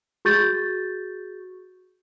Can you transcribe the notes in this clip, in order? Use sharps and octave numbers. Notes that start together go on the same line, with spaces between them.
F#4 G#4 C#6 G6 A6